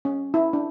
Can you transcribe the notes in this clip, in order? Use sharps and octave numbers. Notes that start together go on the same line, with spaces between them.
C#4
E4
D4